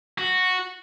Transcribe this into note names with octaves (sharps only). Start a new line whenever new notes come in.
F#4